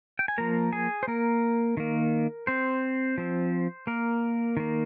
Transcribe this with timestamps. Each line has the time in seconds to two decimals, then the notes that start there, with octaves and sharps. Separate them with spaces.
0.19 G5
0.28 G#5
0.38 F3 A#3 A#4 A#5
0.73 G#4 G#5
1.03 C5
1.08 A#3 A#4
1.77 D#3 A#3
2.47 C4 C5
3.18 F3 C4
3.87 A#3 A#4
4.57 D#3 A#3